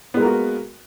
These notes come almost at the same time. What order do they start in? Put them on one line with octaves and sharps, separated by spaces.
B3 G#3 A#3 A#4 F#4